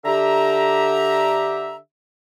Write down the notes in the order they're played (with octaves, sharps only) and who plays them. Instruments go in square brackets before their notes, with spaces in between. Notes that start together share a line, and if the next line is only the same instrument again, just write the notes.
[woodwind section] D3 G4 E5 A#5